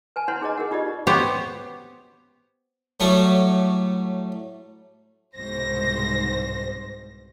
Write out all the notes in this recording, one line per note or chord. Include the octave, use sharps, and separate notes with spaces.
B4 G#5 A5
E4 B4 C#5 F#5 A#5 C6
D#4 G#4 B4 C#5 D#5 A#5
G#4 A#4 F#5
D#4 F4 G4 D5 D#5
B3 G4 C5 C#5
A2 F#3 G3 A3 C#6
C2 G#2 B2 C5 A#6